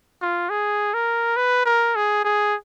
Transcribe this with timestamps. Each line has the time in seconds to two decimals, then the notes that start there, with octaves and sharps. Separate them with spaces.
0.22 F4
0.50 G#4
0.94 A#4
1.37 B4
1.66 A#4
1.96 G#4
2.25 G#4